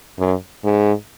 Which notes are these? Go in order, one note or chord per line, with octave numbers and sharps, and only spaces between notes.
F#2
G#2